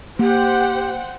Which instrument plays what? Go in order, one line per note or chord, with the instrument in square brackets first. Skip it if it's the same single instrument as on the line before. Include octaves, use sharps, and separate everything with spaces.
[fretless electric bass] A#3 [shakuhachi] G4 [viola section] C5 F#5 G5